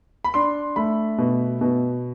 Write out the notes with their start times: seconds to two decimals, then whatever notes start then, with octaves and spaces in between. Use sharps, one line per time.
0.24 B5
0.34 D4 C6
0.76 A3 B5
1.18 B2
1.61 B2